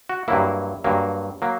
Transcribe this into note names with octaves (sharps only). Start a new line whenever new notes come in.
F#4
G2 F#3 A#3 E4
G2 F#3 A#3
F#3 A#3